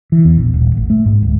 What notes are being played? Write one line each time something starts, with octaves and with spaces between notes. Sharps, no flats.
E3
E2
A#1
D#1
A1
A3
G#2
D1